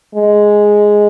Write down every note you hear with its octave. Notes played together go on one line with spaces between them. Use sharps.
G#3